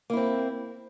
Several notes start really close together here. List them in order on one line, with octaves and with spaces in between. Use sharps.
A#3 E4 C4